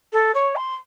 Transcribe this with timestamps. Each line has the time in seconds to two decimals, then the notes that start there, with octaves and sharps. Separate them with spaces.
0.13 A4
0.35 C#5
0.56 C6